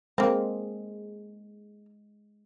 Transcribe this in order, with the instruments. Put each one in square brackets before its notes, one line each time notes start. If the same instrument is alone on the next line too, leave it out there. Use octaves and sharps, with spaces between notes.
[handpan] G#3 [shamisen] A#3 C4